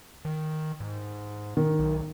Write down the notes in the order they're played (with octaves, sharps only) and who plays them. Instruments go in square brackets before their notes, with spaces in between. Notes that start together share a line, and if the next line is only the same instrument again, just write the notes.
[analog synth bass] D#3
G#2
[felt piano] D#3
[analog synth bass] B1